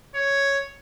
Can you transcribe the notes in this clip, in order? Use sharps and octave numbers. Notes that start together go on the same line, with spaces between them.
C#5